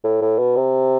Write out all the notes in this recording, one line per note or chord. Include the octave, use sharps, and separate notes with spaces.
A2
A2
B2
C3